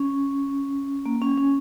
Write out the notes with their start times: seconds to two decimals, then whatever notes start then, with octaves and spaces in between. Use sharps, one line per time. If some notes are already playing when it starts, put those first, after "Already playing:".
Already playing: C#4
1.06 A#3
1.21 C#4
1.37 C#4